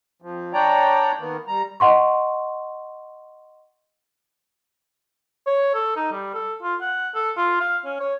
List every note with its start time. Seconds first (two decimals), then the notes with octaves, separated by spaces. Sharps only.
0.22 F2 F3
0.53 D4 C#5 D5 G5 A#5
1.19 D#3 A#3 B3
1.47 G3 A#5
1.80 D#5 F#5 C6 C#6
5.47 C#5
5.74 A4
5.96 D#4
6.12 G3
6.34 A4
6.63 F4
6.81 F#5
7.15 A4
7.37 F4
7.61 F5
7.85 C#4
8.00 C#5